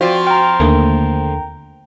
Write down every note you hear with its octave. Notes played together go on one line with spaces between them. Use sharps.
F3 C4 F4 F#4 C5 D5
G5 A#5 F6
D#2 D3 A3 A#3